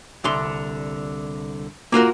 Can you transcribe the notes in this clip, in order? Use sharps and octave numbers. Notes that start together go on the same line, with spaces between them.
C2 D3 C6
A#3 F4 F#4 A#4